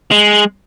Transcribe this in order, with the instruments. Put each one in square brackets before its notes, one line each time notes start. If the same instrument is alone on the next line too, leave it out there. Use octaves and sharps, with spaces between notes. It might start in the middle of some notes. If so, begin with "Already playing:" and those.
[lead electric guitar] G#3